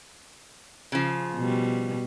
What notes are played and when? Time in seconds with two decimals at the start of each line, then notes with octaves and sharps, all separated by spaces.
0.92 C#3 F3
1.36 B2 G3